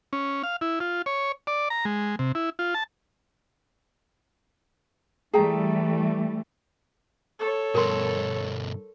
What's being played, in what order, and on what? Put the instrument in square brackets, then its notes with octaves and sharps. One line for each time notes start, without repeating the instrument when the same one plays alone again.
[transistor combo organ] C#4
F5
E4
F4
C#5
D5
A#5
G#3
C3
E4
F4
A5
[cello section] E3 G3 A3 [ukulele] G#4 G5 A#5
[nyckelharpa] A4 C#5
[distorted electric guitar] G2 B2 [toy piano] A#4 C6